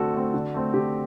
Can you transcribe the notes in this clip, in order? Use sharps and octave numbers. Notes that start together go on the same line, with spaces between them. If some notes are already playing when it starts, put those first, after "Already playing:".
Already playing: D3 A3 C4 F#4 A4
A3 C4
D3
A3 C4
D3 G4